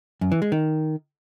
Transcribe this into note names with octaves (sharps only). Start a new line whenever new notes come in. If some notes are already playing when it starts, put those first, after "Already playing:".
F#2
E3
G#3
D#3